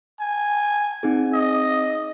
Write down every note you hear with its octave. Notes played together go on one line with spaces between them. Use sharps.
G#5
C4 D#4 G#4
D#5